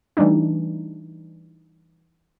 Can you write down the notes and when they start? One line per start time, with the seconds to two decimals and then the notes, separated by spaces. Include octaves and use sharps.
0.17 E3 G3 A3 D4 D#4